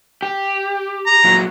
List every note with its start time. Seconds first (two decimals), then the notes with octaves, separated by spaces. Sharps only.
0.22 G4
1.06 A#5
1.25 A#2 F#3